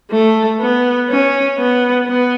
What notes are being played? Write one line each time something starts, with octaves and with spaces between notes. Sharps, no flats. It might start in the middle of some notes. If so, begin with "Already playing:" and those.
A3
B3
C#4
B3
B3